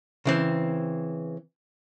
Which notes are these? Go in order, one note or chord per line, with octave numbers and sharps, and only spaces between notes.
C#3 E3 C4